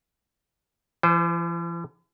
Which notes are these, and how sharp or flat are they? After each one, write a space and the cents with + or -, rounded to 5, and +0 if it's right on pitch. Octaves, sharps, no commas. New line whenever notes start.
E3 +45 C5 -20